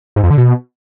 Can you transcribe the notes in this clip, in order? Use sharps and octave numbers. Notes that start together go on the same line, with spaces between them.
G#2
F2
D3
B2